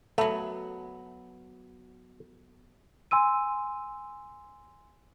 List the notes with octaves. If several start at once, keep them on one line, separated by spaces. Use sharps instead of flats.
F#3 A3 B3
G#5 C6 E6 D#7